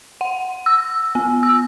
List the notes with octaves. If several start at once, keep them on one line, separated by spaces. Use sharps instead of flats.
F#5
E6
B3
E6